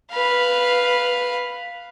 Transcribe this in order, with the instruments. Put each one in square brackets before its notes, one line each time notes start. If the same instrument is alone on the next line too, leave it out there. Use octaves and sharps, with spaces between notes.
[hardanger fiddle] B4 F5